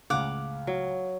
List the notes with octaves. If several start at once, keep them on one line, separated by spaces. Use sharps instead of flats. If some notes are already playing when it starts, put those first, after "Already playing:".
C#2 A2 C#3 F5 F#5 D6
F#3